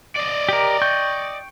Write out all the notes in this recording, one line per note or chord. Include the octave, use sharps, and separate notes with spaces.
D5 D#5
G4 A#4
G5 C#6 G6